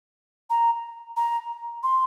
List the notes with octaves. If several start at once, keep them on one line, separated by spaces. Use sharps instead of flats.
A#5
A#5
C6